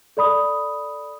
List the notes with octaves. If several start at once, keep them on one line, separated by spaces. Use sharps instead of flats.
A4 D5 B5 D#6